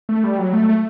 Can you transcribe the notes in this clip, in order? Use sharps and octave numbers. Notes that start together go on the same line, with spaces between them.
A3
G3
F#3
A3
A3